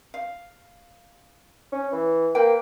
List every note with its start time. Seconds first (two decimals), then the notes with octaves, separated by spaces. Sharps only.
0.14 F5
1.72 C#4
1.92 E3
2.35 A#3 B4 G5